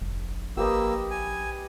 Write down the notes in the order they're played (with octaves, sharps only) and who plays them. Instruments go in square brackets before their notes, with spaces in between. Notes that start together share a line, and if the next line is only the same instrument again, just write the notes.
[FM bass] F1 [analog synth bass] A#1
[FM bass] G1 [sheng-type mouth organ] A#3 E6 [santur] G4 B4 D#5
[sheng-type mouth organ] G#5